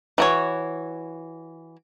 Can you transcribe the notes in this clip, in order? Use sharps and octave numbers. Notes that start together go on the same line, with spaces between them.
E3 F#4 C#5